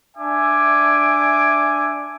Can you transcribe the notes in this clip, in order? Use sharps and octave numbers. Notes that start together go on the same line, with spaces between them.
D4 E5 G#5 D6